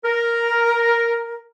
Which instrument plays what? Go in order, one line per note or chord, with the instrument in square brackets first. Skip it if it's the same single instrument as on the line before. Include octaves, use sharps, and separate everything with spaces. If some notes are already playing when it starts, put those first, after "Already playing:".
[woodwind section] A#4